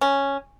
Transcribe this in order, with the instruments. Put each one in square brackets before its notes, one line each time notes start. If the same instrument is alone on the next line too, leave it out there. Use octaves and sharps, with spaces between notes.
[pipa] C#4